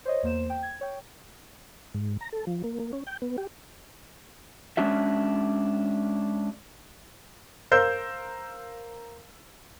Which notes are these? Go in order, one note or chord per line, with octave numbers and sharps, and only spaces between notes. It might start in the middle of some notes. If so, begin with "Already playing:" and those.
C5 C#5 D#5
E2 A#3 C5 E7
G5
G#6
C#5 G5
G#2
A#5
A4
F3
A#3
A#3
C#4
G5
B3
G4
G#3 C#4 D4 F#4 E5
A#4 C5 F5 E6 G6